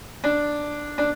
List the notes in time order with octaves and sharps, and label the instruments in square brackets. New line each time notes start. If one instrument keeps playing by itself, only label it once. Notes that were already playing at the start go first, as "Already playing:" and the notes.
[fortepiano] D4
D4